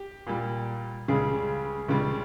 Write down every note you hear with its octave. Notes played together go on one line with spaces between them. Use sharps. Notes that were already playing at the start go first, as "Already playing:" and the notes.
Already playing: G4
A#2 G3
C#2 C#3 G3 G#4
C#2 C#3 G3